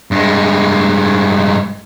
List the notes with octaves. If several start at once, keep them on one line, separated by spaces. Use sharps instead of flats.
G2 G#3